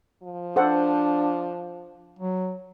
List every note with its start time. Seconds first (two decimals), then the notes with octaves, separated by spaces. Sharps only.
0.23 F3
0.56 D4 A4 C5 F#5
2.19 F#3